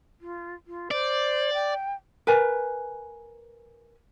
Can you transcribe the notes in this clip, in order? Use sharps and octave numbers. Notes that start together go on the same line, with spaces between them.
F4
F4
C5 D5
G5
A#4 B4 G#5